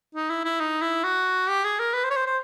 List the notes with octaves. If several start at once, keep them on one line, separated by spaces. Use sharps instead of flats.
D#4
E4
E4
D#4
E4
F#4
G4
G#4
A#4
B4
C5
C#5
C5
C5